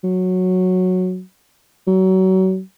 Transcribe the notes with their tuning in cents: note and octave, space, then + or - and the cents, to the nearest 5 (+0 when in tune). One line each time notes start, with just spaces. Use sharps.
F#3 -10
F#3 +30